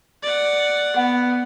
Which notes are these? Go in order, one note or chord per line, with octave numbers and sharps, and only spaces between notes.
D5 F#5
B3 F#5